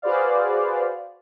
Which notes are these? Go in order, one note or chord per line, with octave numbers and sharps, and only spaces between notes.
F#4 G#4 B4 C5 D5 F5